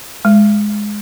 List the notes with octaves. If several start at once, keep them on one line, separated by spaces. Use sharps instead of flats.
G#3